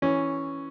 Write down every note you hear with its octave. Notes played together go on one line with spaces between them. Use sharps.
E3 C#4